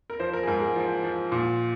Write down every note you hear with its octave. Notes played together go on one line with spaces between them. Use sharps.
A#4
F3 C5
A#4
G#4
G#2 A#4
G#4
F3
F3
A#2